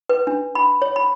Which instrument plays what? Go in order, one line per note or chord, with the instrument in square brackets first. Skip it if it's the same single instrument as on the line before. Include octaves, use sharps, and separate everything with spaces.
[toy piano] B4
D4
B5
C#5
B5